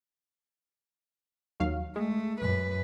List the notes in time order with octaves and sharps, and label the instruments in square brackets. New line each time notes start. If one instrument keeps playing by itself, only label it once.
[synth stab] D#2 F#3 F5
[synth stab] G#3 [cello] A3
[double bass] F#2 [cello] B4